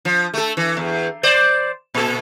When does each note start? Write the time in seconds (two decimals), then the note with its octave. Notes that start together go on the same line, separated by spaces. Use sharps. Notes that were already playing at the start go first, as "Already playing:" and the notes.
0.05 F3
0.34 A3 A4
0.57 E3
0.77 E2
1.23 C5 D5
1.94 A#2 A4